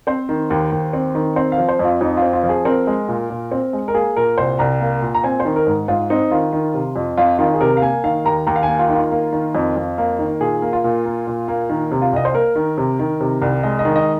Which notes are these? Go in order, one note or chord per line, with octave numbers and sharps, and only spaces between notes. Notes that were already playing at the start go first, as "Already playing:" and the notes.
C4 C5
D#3
D#2
D#2
C4
D#3
C4 C5
F5
F3
C5
F2
F4
F2 D#4
F4
C4
F4
F3
G#4
C4 A#4
G#3
A#2
A#2
C4
G#3
A#4
A#3 G#4
A#2 A#4
C2 C5
C2 A#5
A#3
A#2
A#5
C4 G#5
C5
D#3
A#4
G#2
G#2 F4
C4 D#4
D#3 F4
D#3
C3
F2
F2 F4
D#3 F4
G#4
C3 A#4
F5
A#3 G#5
D#3 F5
D#2 A#5
D#2 A#5
F5
G#5
A#3
F4
D#3
F4
A#3
D#3
F2
F2
A#3
D#3
A#2 G#4
A#3
F4
A#2
A#3
A#2
A#3
D#3
C3
F4
C2 D#5
C5
A#3 A#4
D#3
C3
D#3
C3
C2
G#3 D#5
D#5
D#3
D#5